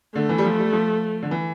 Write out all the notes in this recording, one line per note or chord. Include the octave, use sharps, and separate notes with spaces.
D3 A3
E3
G3
F3
G3
F3
D3
E3